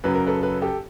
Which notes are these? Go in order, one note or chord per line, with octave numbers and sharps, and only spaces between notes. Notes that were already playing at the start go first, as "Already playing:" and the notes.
F#2 C#3 F#3 B4
A#4
A4 B4
A4 B4
G4 A4